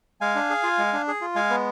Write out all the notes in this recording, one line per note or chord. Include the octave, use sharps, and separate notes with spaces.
G#3 F5 G#5
D4
G#4
F4
G#3
D4
G#4
F4
G#3 F5 G#5
B3